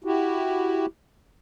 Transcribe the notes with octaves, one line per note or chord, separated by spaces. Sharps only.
E4 F#4 G4